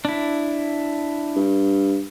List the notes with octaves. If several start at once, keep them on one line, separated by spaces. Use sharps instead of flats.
D4 E4
G2